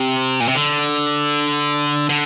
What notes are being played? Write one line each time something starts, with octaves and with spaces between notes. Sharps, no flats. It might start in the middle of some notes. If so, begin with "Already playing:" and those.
Already playing: C3
A#2
C3
D3
D3